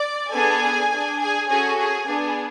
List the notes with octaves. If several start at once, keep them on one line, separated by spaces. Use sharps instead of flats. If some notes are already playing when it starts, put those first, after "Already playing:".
Already playing: D5
B3 D4 G#4 A4 G#5
D4 G#4
G#4 G#5
C#4 F#4 G#4 A4 G#5
G#4 G#5
B3 D4 G#4